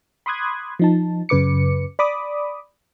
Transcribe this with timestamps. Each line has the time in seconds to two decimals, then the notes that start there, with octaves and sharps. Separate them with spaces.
0.26 B5 C6 D6 D#6 F#6 G#6
0.79 F3 D#4 A5
1.29 F#2 C#3 B4 D6 C#7
1.99 D5 B5 D6 D#6